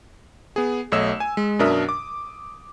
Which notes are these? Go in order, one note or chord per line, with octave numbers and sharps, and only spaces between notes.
B3 G#4
B1 A3 C#5 D#5 E6 E7
G#5
G#3
F#2 B2 D4 A#4 E5 D#6
D6